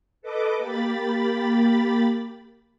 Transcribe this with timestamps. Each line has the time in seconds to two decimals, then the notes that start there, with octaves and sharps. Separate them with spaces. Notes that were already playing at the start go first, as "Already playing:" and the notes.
0.22 A4 B4 D#5 D6
0.58 A#3 G4 B5 A6